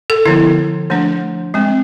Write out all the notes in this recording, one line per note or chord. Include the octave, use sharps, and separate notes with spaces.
A4
D3 F3 B3 E4
F3 A3 D4
G#3 C4